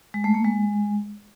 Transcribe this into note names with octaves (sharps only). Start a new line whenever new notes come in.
G#3
A3
A#3
G#3